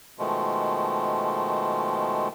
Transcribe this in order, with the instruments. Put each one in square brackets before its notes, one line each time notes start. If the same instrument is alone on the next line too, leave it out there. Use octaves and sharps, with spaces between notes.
[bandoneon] B2 D#3 F3 G#3 A3